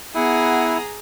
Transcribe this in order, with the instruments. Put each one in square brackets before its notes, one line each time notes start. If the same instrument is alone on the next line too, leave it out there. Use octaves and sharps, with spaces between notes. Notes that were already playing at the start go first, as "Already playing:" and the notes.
[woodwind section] B3 F#5 [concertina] E4 [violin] G#4 A#5